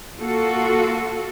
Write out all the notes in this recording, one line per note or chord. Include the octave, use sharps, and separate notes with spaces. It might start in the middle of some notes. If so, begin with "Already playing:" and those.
A#3 F4 F#4 A4